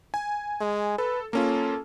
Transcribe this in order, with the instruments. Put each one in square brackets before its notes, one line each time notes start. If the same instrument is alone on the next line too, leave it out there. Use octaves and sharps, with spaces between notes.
[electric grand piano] G#5
[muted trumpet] G#3
[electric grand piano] A4 [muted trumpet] B4
[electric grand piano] A#3 C#4 F4 [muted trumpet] A4